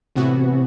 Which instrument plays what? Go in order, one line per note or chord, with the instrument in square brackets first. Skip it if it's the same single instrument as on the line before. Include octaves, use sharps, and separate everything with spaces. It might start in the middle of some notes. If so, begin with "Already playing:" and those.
[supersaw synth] A2 E3 B3 F#4 [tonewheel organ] C3